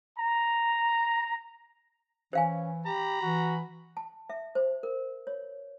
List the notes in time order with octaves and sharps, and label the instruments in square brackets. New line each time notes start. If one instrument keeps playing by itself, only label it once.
[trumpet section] A#5
[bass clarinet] E3 [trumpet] C#4 [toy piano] C5 F5 G#5
[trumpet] G4 [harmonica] A#5 B5
[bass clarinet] E3 [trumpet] F#4
[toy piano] A5
E5
C5
A#4
C#5